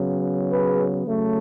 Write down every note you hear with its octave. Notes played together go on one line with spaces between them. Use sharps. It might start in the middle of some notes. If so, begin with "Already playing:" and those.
Already playing: C#3 F#3 B3
G#4 B4
C#3 F#3 A3